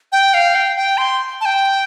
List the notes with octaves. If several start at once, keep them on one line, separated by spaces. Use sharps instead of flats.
G5
F5
G5
G5
C6
A5
G5